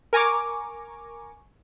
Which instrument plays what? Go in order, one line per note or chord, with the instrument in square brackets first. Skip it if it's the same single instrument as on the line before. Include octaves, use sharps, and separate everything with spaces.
[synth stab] A#4 G#5 A#5 C#6 D6